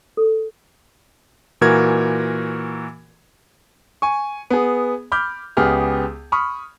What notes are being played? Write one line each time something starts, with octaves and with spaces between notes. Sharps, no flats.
A4
A#2 E3 F#4 A#4 G#6
G#5 C#6
B3 G#4
B5 D6 F6 G6
C#2 B3 G4 G#4 F6
B5 C#6 D#6 F6